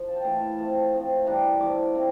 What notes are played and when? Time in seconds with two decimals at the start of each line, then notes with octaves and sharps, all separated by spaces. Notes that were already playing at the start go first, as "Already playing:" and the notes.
Already playing: F3 F4
0.08 A5
0.16 G5
0.24 A2 E3 A3 F5
0.36 E5
0.47 F5
0.58 F3 A3 C4 A5
0.92 A2 F3 C4
1.26 E3 G3 D4 A#5
1.60 A2 F3 A3 D6
1.95 A3 C4 E4